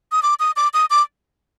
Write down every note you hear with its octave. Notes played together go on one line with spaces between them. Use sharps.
D#6
D6
D#6
D6
D#6
D6